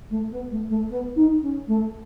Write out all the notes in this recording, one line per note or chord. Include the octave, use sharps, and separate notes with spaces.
A3
B3
A3
A3
B3
D#4
C#4
A3